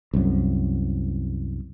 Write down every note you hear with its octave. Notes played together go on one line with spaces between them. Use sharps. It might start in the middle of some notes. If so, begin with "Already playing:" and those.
C2 F#2